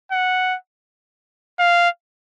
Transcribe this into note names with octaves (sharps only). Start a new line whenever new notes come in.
F#5
F5